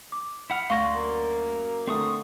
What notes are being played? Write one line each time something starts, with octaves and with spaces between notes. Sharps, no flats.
D6
E4 F#5 F6
D2 D5 F5 C6 C#6 A#6
F#2 A#3
D3 A3 C4 C#6 D#6